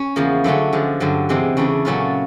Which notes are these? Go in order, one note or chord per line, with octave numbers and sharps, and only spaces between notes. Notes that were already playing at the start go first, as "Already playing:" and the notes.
Already playing: C#4
E2 C#3 F3 A#3
D3 F#3 A3 C#4
D3 F3 G#3
G2 D3 F#3
E2 C3 E3 G#3 C4
C#3 E3 A3 D4
A#2 F#3 A3 C#4 F4